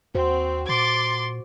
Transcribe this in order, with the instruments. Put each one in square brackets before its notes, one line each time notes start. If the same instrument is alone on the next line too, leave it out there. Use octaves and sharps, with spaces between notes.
[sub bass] D#2 [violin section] C4 [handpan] F#4 C5
[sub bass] A#2 [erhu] C6 [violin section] D6 A6